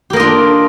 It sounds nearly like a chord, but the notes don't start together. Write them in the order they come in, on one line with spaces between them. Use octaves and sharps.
G4 A#3 D#5 F4 D4